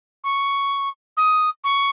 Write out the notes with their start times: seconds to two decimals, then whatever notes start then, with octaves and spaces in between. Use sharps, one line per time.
0.24 C#6
1.17 D#6
1.64 C#6